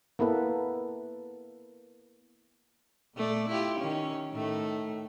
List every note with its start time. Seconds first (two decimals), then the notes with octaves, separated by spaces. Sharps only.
0.19 A#3 B3 E4 A4 B4
3.15 A#2 A3 D5
3.49 E4 F4 G4
3.79 D#3 C#4
4.32 A2 D#3 A3